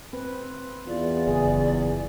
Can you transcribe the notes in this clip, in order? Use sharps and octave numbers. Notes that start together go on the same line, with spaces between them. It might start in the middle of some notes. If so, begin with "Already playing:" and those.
C4 B4
E2 F4 D5
F#1 G#4